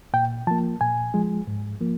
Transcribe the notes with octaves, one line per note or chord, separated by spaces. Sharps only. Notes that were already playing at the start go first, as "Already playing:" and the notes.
A#2 G5
F3 A#3 A5
A#2 G#5
F3 G#3
G#2
F3 A#3